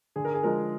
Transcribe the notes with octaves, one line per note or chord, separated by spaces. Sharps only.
D3 G#4
A#4
G#4
F3 G#3 A#4